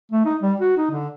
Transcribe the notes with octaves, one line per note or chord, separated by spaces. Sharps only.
A3
D#4
G3
F#4
D#4
D3